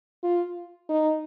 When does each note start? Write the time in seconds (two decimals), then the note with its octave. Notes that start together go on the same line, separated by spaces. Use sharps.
0.23 F4
0.89 D#4